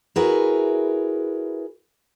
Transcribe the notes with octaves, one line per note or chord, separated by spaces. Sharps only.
E4 F#4 G#4 A#4 B4 E5